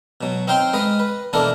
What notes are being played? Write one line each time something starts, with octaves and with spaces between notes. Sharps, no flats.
B2 F#3
C4 D#4 F5 G5 C6
G#3 B4 D#5 F5
B4
B2 E3 A#3 D4 A4 A#4